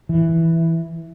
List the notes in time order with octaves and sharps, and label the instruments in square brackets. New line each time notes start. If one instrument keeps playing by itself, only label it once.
[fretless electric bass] E3